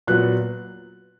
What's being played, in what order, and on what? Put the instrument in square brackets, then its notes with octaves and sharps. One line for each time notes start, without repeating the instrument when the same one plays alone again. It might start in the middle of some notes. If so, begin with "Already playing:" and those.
[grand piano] A#2 F#3 B3 F#6